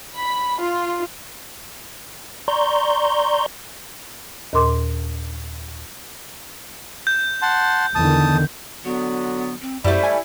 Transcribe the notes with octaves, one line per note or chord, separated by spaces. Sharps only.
B5
F4
D5 A#5 C6 C#6 G6
D#2 A#2 A#4 C6 D6
G6
F#5 A5 C6
E2 D3 D#3 A5 D#6
D3 F#3 B3
C4
F#2 G3 A3 E4 C5
G#5